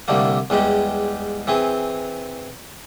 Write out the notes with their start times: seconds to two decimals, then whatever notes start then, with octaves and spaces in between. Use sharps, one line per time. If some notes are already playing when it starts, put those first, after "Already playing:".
0.08 C2 D3 G3 A3 A#3
0.50 E2 G3 G#3 G4
1.47 E3 C4 G#4